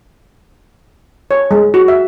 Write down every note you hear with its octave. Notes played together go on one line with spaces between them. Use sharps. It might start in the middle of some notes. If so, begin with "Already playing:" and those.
C#5
G#3
F#4
E5